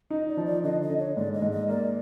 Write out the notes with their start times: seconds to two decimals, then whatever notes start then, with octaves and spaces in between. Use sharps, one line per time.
0.10 D#4 D#5
0.29 D5
0.37 F3
0.46 D5
0.64 D3 D#5
0.82 D#5
0.90 D3
0.99 C#5
1.17 G#2 D5
1.34 D#5
1.42 G#2
1.52 D#5
1.69 A#3 D5